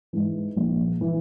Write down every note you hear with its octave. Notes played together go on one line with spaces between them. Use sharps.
G#2 E3
A#1
E3